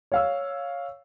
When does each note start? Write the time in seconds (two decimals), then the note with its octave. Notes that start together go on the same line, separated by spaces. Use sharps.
0.12 C#5 F5 E6